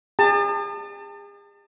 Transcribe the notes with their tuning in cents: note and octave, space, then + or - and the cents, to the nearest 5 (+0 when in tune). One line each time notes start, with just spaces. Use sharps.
G#4 -40 A5 +30